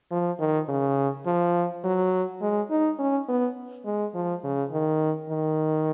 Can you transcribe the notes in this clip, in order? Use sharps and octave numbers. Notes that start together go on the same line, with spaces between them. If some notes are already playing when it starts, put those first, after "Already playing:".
F3
D#3
C#3
F3
F#3
G#3
D#4
C#4
B3
G#3
F3
C#3
D#3
D#3